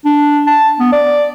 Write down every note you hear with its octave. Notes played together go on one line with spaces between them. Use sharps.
D4
A5
B3
D5